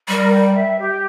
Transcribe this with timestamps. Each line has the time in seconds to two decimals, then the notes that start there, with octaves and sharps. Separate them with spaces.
0.08 G3 A#4
0.31 G5
0.54 E5
0.77 G4